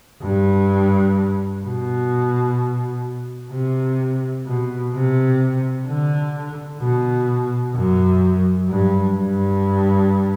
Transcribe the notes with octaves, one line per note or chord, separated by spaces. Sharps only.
G2
B2
C3
B2
C3
D3
B2
F#2
G2
G2